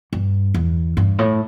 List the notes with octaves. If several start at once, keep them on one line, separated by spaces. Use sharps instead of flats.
G2
E2
G2
A2